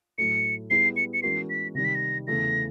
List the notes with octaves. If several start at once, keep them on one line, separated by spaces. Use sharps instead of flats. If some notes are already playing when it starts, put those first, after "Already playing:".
A2 F#3 A3 C#7
G3 B3 E4 G#4 C7
C#7
C#7
E3 G#3 C#4 F#4 A#4 C7
B6
C3 D#3 G3 A#6
B6
A#6
E2 C#3 E3 A3 A#6